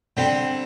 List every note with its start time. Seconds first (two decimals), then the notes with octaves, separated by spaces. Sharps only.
0.17 D3 G3 C4 G5